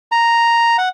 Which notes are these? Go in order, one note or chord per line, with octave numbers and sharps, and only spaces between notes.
A#5
F#5